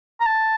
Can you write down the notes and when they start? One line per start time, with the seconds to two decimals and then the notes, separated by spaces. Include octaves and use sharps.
0.20 A#5
0.26 A5